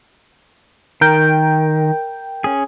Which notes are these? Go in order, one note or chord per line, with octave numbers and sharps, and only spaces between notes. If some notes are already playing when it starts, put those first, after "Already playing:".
D#3 A#4 G5
C#4 G#4